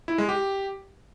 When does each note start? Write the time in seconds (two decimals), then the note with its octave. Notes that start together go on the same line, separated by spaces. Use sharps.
0.08 E4
0.18 G#3
0.29 G4